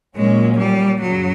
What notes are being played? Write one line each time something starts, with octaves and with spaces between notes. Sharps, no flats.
A#2 F#3 G#3 A#3 C#4
G3
F#2 C#3 F#3